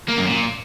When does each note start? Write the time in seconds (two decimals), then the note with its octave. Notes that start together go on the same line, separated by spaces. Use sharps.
0.08 A#3
0.17 F#2
0.26 A#2